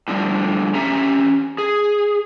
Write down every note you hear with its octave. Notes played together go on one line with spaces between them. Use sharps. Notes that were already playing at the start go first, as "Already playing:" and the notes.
A2 D3 F3 G3
C#4 G4 E5 A#5
G#4